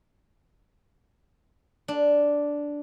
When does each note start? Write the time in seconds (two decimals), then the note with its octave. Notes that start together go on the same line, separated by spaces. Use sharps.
1.88 D4